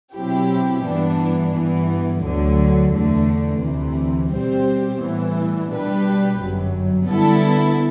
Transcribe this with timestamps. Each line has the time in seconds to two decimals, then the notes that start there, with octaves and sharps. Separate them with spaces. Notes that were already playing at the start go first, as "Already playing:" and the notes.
0.15 B2 F#3 C4 E4 G4
0.85 G2 E3 B3 D4
1.54 G2 E3 B3
2.23 D2 D3 F#3
2.93 E2 D3 A3
3.62 D2 C3 E3
4.32 B2 G3 C4 G4 C5
5.02 A2 E3 G3 B3
5.71 B2 G3 D4 G4 B4
6.40 G1 F#2 F#3
7.10 D3 G3 B3 E4 A4